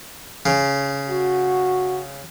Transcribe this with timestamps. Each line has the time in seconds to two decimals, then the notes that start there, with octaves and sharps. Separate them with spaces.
0.46 C#3
1.10 F#4